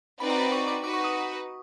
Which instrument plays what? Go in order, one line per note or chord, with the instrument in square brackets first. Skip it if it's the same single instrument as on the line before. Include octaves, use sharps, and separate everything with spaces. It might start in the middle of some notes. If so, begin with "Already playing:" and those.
[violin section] C4 D#4 F#4 B4 D5 [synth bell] B5
[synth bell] A#5
B5
C#6
D6
[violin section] D#4 F#4 B4 [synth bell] D6
[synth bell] C#6
D#6